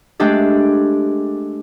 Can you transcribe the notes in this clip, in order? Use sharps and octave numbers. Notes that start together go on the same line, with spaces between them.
G#3 A3 D4 G4 D5